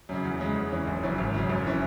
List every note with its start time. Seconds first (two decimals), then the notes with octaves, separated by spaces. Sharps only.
0.09 F#2 C#3
0.25 E2
0.40 C#3 G#3
0.56 E2
0.72 E3 C#4
0.87 F#1
1.03 F#2 C#3 E3 C#4
1.18 G#1
1.34 F#2 C#3
1.49 F#1
1.67 E3 C#4